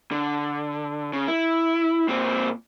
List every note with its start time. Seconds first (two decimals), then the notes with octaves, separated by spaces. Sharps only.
0.11 D3
1.13 C#3
1.28 E4
2.09 A#2 C4